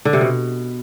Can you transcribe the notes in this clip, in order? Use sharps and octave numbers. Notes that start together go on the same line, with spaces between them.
D3
C3
B2